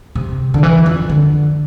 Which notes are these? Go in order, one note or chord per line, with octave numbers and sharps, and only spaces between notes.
C3
D3
E3
F2
D3